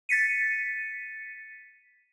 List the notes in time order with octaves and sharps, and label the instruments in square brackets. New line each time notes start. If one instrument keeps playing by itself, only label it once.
[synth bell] A6 B6 C#7 D#7